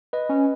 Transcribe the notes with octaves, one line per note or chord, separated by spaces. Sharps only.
B4 D#5
C#4